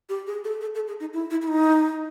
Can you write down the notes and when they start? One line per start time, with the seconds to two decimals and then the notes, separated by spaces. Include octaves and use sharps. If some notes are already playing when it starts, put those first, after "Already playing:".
0.09 G4
0.27 G#4
0.44 A4
0.61 A4
0.75 A4
0.88 G#4
1.00 D#4
1.13 E4
1.30 E4
1.42 E4
1.48 D#4